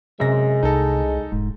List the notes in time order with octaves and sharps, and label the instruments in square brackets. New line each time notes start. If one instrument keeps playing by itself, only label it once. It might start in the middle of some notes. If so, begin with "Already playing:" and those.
[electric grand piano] F#2 A#6 [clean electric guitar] C3 C5 E5 [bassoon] G#3
[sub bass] C2 [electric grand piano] D#4 A4
[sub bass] E1 [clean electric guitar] G#2